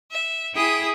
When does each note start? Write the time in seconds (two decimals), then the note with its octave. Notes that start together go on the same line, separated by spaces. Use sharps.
0.11 E5
0.54 E4 G#4 G5 D#6